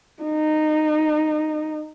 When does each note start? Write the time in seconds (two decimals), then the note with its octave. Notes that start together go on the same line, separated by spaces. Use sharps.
0.22 D#4